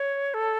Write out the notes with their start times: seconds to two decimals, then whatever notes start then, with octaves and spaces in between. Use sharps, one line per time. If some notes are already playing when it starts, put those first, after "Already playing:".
Already playing: C#5
0.34 A4